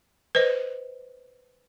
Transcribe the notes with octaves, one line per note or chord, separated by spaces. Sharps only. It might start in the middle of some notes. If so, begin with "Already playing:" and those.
B4 C5 D#5